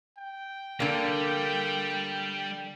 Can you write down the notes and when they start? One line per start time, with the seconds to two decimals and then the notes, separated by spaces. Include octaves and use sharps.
0.18 G5
0.80 D3 G3 A#3